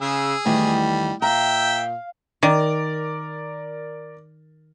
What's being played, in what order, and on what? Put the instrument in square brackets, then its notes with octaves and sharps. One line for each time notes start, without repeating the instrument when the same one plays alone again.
[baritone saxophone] C#3 [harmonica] G#4 [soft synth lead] E6
[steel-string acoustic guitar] E2 D#3 [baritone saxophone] G3 [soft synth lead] A3
[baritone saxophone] A#2 [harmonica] E5 G5 [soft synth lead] F5 [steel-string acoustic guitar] A#5
[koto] D#3 [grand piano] A#4 D5